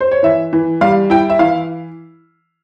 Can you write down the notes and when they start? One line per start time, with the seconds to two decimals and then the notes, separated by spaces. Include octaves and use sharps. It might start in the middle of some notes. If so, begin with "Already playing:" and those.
0.01 C5
0.11 C#5
0.23 E3 E5
0.53 E3
0.81 G3 F5
1.10 E4 G5
1.30 E5
1.39 E3 F5